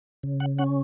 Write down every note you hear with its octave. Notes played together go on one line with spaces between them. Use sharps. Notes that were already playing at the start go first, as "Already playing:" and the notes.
C#3
F#5
C#4 F#5